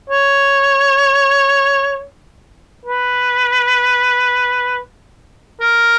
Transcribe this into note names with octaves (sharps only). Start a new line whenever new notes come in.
C#5
B4
A#4